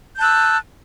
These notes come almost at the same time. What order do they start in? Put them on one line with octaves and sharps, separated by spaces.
G6 A5 F#6 E6